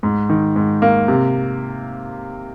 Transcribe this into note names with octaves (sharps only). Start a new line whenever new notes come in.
G#2
D#3
G#2
A#3
C3